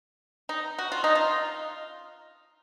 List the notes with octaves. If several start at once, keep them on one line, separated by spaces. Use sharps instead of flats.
D#4
F#4
F4
D#4
F4